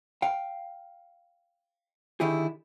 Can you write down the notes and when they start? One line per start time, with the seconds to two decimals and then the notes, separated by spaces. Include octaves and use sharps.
0.22 F5 G5
2.20 D3 D#3 E4 G4 G#4